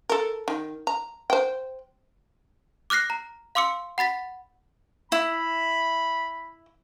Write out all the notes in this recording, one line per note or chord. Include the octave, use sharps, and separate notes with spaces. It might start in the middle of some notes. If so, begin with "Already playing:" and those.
A4 A#4
D#3
A#5
C5 G5
D6 F6 F#6 A#6 C7
A#5
F5 C6 D6 E6 C#7
F#5 B5 A6 B6
E4 B5